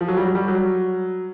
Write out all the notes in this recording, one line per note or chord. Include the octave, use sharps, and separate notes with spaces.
F3
F#3
G3
F#3
G3
F#3